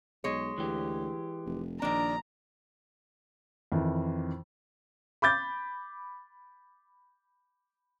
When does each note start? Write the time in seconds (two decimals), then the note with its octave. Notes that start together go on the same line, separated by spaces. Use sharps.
0.24 B1 G#3 C#5
0.58 D2 E3 G4
1.45 F1
1.82 A#1 D#3 D4 A#5
3.72 F2 D#3 E3
5.22 B5 D6 G6 A6